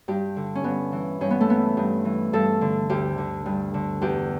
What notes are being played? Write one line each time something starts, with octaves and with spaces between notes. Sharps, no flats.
G2 G4
D3
C#4
G2 B3
E3
G2 C#4
B3
A3
E3 B3
G2
E3
G2 A4
D3
D2 G4
D3
G2
D3
E2 G4